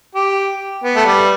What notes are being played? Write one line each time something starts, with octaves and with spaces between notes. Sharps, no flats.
G4
B3
A3
G3